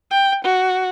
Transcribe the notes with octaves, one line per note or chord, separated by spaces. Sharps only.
G5
F#4